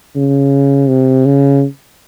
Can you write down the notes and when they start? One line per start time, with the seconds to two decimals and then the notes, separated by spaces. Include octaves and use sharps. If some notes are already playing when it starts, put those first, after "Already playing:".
0.16 C#3
0.89 C3
1.25 C#3